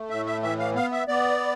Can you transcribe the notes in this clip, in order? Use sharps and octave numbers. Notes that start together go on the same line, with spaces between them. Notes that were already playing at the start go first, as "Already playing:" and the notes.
Already playing: A3
A2 E5
E5
E3 E5
F5
B3 F5
E5
B3 D5